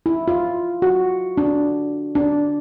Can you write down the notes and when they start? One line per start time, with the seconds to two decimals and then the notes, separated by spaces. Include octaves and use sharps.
0.06 E4
0.28 F4
0.82 F#4
1.38 D4
2.15 D4